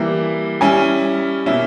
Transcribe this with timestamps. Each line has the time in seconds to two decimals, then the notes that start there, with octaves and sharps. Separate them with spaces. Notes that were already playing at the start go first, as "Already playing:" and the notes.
Already playing: E3 G3 A#3 E4
0.61 G3 C#4 E4 G#5
1.46 B2 A#3 C#4 E4 E5